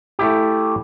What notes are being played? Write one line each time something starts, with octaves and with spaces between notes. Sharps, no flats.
A3 E4 G4